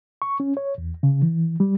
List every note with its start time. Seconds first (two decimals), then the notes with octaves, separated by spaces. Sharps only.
0.22 C#6
0.40 C#4
0.57 C#5
0.78 E2
1.03 C#3
1.22 E3
1.60 G3